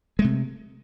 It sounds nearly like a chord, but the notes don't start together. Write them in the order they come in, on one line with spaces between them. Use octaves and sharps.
G#3 A3 C3